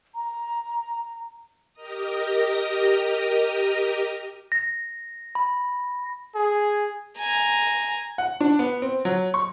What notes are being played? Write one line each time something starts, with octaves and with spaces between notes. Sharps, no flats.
A#5
G4 A#4 D#5 A#5 D#6
A#6
B5
G#4
G#5 A#5
F#5
D4
B3
C4
F#3
C#6